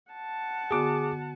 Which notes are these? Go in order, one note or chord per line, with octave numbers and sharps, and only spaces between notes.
F#5 A5
D3 B3 F#4 G#4 D6